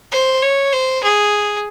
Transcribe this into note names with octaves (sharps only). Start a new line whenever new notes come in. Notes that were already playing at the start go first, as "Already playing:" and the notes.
C5
C#5
C5
G#4